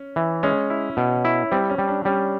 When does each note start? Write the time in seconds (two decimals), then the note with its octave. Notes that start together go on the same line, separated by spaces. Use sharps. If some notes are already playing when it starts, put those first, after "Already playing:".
Already playing: C#4
0.16 E3
0.43 G#3 C#4
0.70 E4
0.97 B2
1.25 E4
1.51 G3 C4
1.70 C#4
1.78 G3
1.88 D4
2.05 G3 C#4